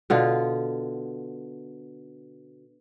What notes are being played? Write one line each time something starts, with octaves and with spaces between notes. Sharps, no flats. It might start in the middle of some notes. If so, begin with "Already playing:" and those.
B2 D3 F4